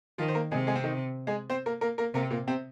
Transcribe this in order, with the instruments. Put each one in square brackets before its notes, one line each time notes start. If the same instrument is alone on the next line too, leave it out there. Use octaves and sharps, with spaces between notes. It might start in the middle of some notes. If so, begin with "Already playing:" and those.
[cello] D#3 [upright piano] F3 F4
[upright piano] C5
A#3 A#4
[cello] C3 [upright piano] G#3 G#4
[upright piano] G#3 G#4
C4
D#3 D#4
G#3 G#4
C4 C5
A#3 A#4
A#3 A#4
A#3 A#4
[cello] C3 [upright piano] A#3 A#4
[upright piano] A#2 A#3
C3 C4